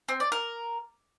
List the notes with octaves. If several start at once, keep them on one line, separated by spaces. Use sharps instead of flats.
C4
D5
A#4